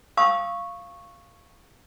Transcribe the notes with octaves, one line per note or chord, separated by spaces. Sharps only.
F5 C#6 D#6 E6